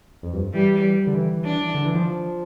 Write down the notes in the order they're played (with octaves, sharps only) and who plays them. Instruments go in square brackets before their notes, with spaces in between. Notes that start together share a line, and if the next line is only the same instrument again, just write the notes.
[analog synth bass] F2
G2
[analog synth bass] E3 [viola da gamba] G3
[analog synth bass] D3
E3
[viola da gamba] D4
[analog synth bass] D3
E3
F3